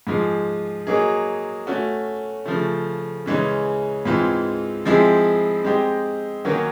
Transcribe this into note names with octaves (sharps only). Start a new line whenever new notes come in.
G#2 F3 G#3
F#3 A#3 D#4 G#4
A3 C#4 F#4
C#3 F3 A3
C#3 E3 G#3 C#4
G#2 E3 G#3 C4 F4
F3 G#3 C4 E4 G#4
G#3 C4 D#4 G4
D#3 F#3 A#3 C#4 F#4